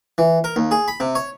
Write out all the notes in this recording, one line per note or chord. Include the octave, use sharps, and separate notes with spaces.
E3
A#4
D#2
G#4
B5
C3
C#5